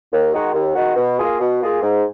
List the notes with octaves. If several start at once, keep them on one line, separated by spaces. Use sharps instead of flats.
D#2
D#3 G#3 D#4 F#4
D#2
D#3 G#3 D#4 F#4
B2
A#3 F4 G#4
B2
A#3 F4 G#4
G#2